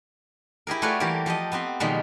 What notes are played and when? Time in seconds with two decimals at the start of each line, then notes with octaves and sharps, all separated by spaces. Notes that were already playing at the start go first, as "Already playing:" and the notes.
0.67 E4 G4 G#4 A#4
0.82 A3 F4 F#4 B4 C#5 D5
1.00 E3 G3 A#3 G4 A#4
1.26 F3 G4 A4 D#5
1.52 B3 C4 G4 C5
1.80 B2 D#3 F3 G3 G#3 A#3